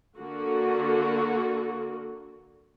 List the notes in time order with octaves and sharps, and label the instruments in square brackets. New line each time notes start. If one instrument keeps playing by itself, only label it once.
[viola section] D3 A#3 F#4